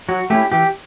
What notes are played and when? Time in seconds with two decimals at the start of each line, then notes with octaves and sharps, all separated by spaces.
0.09 F#3 F#4
0.30 A3 C#4 E4 G4
0.52 E3 G4